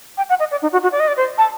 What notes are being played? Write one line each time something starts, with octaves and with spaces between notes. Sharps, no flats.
G5
F#5
D#5
D5
D#4
F#4
F#4
D5
D#5
D5
C5
A5